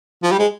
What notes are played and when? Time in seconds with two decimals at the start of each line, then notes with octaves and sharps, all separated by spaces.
0.23 F3
0.32 G3
0.39 G#3